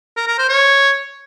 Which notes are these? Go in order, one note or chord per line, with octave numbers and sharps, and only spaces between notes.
A#4
A#4
C5
C#5